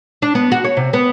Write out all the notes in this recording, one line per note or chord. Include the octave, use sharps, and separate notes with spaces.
D4
B3
F#4
C#5
C3
B3